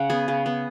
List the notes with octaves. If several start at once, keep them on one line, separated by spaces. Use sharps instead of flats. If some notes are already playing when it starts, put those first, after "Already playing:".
Already playing: C#3 F#5
B3 G#4
C#3
B3